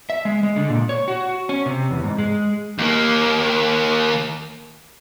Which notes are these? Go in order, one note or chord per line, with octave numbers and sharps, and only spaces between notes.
E5
G#3
G#3
D3
A#2
C#5
F#4
C#4
C3
E2
G#2
G#3
D#2 A#3